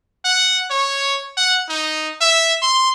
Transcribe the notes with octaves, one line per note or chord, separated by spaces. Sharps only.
F#5
C#5
F#5
D#4
E5
C6